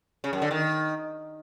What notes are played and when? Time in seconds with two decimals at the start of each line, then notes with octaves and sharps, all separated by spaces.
0.24 C#3
0.33 F#2
0.42 D3
0.51 D#3